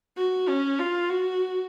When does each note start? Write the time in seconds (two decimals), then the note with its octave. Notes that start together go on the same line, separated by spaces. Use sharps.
0.17 F#4
0.48 C#4
0.79 F4
1.10 F#4